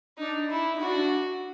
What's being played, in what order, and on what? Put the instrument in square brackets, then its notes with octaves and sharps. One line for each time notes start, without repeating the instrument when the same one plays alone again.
[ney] D4 [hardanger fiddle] D#4
[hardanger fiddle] E4
[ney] D#4
[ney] D4 [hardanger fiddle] F#4